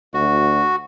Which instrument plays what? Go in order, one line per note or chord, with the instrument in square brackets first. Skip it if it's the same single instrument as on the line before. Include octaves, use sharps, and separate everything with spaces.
[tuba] D2 [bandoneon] F#4